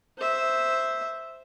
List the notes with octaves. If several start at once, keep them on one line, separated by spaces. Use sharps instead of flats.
C5 E5